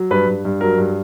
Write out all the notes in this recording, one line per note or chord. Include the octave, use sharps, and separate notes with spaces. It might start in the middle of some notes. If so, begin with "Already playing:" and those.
Already playing: F#3
G2 B4
G2
G2
F#3 A#4
G2